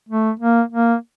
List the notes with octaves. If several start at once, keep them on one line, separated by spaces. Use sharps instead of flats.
A3
A#3
A#3